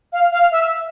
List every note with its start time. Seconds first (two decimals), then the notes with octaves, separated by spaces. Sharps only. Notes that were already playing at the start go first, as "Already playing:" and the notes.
0.13 F5
0.32 F5
0.51 E5